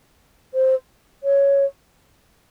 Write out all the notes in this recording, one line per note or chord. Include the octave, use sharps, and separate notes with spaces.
C5
C#5